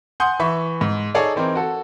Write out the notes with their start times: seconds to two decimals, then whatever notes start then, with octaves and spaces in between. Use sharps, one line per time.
0.20 F#5 G#5 C6 D#6 G6
0.40 E3 E5 B5 C#6
0.81 G#2
1.15 D#4 G#4 A4 C#5 D5
1.36 E3 C4 D#4 A#4
1.55 F#4 A4